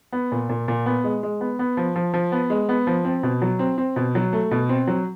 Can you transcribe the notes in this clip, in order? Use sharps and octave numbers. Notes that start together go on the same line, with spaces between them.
B3
A#2
A#2
A#2
B3
G#3
G#3
B3
B3
F3
F3
F3
B3
G#3
B3
F3
C4
B2
F#3
C4
C4
B2
F#3
A3
B2
C4
F#3